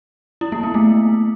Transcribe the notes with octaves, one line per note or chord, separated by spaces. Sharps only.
E4
A#3
B3
A3